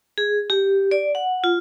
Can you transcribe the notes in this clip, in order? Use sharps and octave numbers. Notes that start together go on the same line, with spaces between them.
G#4
G4
D5
F#5
F4